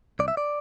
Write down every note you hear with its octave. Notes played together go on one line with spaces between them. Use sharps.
C2 D5
E5
D5